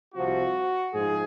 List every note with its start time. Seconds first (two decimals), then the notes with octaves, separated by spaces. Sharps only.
0.14 C2 C3 F3 F#4
0.93 G#2 F3 G#3 G#4